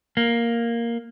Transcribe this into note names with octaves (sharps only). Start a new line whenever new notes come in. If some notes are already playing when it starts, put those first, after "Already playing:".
A#3